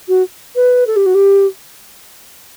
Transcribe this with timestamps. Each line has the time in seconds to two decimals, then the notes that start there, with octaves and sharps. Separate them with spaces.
0.08 F#4
0.55 B4
0.87 A4
0.96 G4
1.06 F#4
1.14 G4